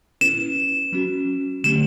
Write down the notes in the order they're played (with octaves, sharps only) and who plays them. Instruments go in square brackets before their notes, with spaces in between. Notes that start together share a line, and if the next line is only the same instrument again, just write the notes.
[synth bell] C#4 E4 B4 [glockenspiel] E7
[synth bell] F#3 C#4 F#4
[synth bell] D3 F#3 A3 C#4 G4 [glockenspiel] E7